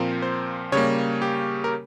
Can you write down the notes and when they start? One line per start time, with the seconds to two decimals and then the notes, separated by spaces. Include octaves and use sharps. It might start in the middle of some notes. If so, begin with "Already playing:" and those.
Already playing: A#2 F3 C4 A#4
0.22 C5
0.72 C#3 G3 A#3 C#5
1.22 G4
1.64 A#4